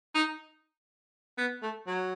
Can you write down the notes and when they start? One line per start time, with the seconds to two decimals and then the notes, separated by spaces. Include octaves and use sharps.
0.15 D#4
1.38 B3
1.63 A3
1.87 F#3